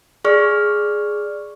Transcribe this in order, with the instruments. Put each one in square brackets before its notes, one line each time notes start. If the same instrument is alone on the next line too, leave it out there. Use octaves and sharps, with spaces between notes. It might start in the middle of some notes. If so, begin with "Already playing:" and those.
[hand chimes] G#4 D5 C#6 F6